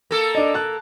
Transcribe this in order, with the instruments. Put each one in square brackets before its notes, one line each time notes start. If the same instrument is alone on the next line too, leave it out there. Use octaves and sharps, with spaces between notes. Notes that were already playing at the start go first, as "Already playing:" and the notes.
[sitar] A#3 A4
[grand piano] D4 D#5
A5 F#6